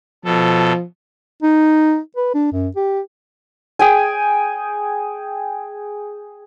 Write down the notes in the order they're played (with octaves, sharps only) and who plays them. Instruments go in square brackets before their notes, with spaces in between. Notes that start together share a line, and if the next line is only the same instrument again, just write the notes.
[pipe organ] B2 A4 [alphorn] F3
[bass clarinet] D#4
B4
D4
F#2
G4
[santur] G#4 G5 G#5